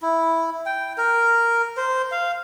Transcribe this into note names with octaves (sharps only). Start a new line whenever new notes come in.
E4
G5
A#4
C5
F5